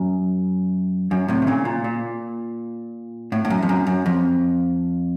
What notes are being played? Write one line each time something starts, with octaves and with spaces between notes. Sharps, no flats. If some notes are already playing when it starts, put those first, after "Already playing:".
Already playing: F#2
F#2
A2 C3
D#3
A#2 C#3
A#2
A#2
A2
A2
F#2
F2
F#2
F#2
F2